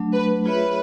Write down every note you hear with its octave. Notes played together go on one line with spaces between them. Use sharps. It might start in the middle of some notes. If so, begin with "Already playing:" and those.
Already playing: F#3 A3 D4
B4
F4 G#4 B4 C#5 E5